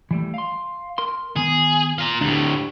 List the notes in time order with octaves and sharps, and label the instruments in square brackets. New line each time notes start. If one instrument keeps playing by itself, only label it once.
[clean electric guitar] E3 G3 A3
F5 C6
A#4 C6
[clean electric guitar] D#3 B3 [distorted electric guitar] G#4
[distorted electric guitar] F4 A#5
[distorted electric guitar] D2 A2 [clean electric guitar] D4 G4